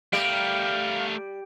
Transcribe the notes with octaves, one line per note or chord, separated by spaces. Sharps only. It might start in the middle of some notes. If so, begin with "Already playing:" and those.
G3 A3 A#4 F5 D7